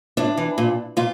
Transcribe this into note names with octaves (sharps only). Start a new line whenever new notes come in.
A2 D4
E3
A#2
A#2 F4